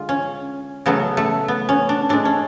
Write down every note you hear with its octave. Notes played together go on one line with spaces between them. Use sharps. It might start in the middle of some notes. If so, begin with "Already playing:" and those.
Already playing: D3 G#3 F4
C#4
C#3 F#3 A3 B3
A3
B3
C#4
D4
A2 G#3 D4
C#4